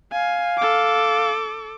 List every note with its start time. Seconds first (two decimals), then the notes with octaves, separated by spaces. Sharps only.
0.12 F5 G#5
0.58 A4 D6